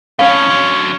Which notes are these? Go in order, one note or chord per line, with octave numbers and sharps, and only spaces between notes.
F2 A2 C#4 F5
D3 F#3